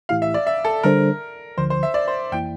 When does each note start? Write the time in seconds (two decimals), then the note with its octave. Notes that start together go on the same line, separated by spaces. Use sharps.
0.09 A2 E3 A3 E4 G4 F5
0.22 E5
0.34 D5
0.47 E5
0.65 A4
0.83 D3 G3 D4 A4 A#4 C5
1.57 D2 D3 F3 C5
1.70 C5
1.83 E5
1.94 D5
2.08 C5
2.32 F2 E3 A#3 E4 G5